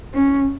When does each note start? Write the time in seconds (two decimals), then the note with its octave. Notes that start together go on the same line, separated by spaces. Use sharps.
0.15 C#4